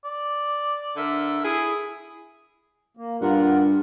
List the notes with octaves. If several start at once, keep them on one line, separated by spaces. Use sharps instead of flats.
D5
D3 A#4 E5
E4 G#4
A#3
G2 F4 A#4 F#5